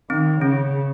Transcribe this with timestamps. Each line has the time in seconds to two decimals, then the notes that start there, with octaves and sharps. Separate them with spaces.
0.10 D#3 C4
0.41 C#3 C#4